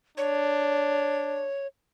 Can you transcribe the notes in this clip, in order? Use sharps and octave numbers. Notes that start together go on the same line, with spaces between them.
D4 C#5